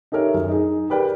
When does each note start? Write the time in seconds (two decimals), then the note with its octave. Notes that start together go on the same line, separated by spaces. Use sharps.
0.12 D#4 G4 A4 A#4 C#5 E5
0.34 F#2
0.49 D#4 G#4
0.90 G4 A#4 B4 D5 G5